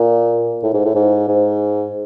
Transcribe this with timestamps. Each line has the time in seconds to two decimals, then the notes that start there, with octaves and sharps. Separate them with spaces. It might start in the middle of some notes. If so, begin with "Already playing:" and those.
Already playing: A#2
0.63 A2
0.74 G#2
0.85 A2
0.95 G#2
1.29 G#2